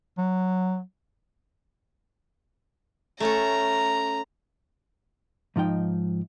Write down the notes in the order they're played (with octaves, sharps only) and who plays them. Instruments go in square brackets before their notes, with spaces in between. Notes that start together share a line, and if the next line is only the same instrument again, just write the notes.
[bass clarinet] F#3
[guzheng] A3 C#4 A4 [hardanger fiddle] A#5
[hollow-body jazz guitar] G#2 F3 D#4 G5